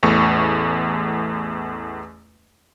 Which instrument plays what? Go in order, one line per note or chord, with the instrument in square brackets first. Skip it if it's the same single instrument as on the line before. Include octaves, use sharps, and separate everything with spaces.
[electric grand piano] A1 E2 A3 C#6